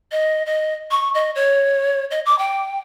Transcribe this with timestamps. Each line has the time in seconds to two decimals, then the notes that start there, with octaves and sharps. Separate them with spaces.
0.12 D#5
0.46 D#5
0.91 C#6
1.14 D#5
1.35 C#5
2.11 D#5
2.26 D6
2.39 G5